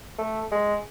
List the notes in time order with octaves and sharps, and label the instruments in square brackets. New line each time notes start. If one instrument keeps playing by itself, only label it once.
[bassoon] A3
G#3